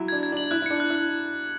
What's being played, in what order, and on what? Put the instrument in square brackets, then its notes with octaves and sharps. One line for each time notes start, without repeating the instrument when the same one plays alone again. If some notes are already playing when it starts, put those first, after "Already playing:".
Already playing: [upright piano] F#3 E4
[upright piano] D4 [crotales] G#6
[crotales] G#6
[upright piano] D4
[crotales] F#7
[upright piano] E4 [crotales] F#6
[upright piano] E4
[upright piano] D4 [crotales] C#7
[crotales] F#6
[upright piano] E4
[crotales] F#6